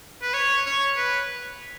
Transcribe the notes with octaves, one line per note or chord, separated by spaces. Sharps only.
B4
C#5
C#5
B4